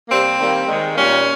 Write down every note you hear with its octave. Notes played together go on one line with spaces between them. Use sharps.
C3 G3 A#3 C4
D#3 G3 A#3
D#3 G#3
A#2 G3 A#3 C#4